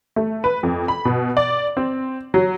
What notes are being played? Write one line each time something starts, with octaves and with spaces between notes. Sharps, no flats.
A3
B4
F2
B5
B2
D5
C4
F#3